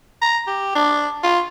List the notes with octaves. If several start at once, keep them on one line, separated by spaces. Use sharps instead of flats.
A#5
G4
D4
F4